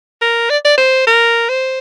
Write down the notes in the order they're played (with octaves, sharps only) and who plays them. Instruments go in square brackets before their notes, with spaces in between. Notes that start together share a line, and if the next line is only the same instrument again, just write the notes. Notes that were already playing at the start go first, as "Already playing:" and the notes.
[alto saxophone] A#4
D5
D5
C5
A#4
C5